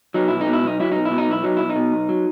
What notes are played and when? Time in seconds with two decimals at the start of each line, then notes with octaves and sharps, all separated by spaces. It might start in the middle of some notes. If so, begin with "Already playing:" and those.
0.14 F#3 D#4
0.28 B1 E4
0.41 D#4
0.47 B2
0.53 E4
0.63 B1 D#4
0.80 F#3 E4
0.92 B1 D#4
1.05 E4
1.11 B2
1.18 D#4
1.28 B1 E4
1.44 F#3 D#4
1.57 B1 E4
1.70 D#4
1.76 B2
1.92 B1
2.09 F#3